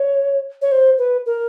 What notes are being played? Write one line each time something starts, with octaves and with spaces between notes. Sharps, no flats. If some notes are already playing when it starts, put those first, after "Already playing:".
Already playing: C#5
C#5
C5
B4
A#4